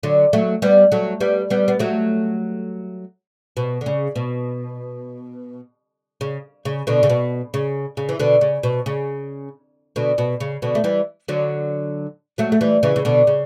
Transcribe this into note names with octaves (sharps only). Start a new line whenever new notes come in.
D3 F#3
F#3 A3
G3 B3
F#3 A3
G3 B3
G3 B3
B3
F#3 A3
B2
D3
C#3
B2
C#3
C#3
B2 D3
C#3
B2
C#3
C#3
E3
B2 D3
C#3
B2
C#3
B2 D3
B2
C#3
B2 D3
A3
E3 G3
D3 F#3
F#3 A3
A3
E3 G3
C#3 E3
C#3
B2 D3
C#3